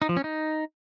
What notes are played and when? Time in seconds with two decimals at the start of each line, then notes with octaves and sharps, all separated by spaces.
0.02 D#4
0.09 F3
0.17 C#4
0.24 D#4